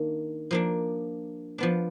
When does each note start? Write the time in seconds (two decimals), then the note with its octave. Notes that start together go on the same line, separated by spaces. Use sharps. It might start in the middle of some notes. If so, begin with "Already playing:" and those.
Already playing: D#3 A#3 D4
0.51 F3 A#3 D4
1.58 F3 B3 D4